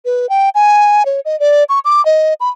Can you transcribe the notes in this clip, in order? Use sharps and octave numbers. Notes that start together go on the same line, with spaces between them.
B4
G5
G#5
C#5
D#5
D5
C#6
D6
D#5
B5